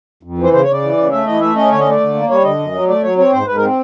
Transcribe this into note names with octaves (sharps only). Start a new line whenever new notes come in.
F2
E3 C5
C#3 C5
C#5
C#3 D5
E3
C#3
A3 E5
E3 D#5
A3 E5
C#4 D#5
D3 C#5
D#5
A3 D5
D3
A#3
G3 C#5
D3 D#5
F#2
F#3
A3 D5
F#3 C#5
C4 C#5
G#2 C5
G#2 B4
A#4
C4